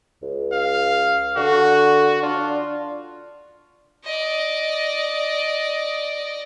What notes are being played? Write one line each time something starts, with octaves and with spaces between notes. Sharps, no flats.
C#2
F5
D3 F#4
D4 F4
D5 D#5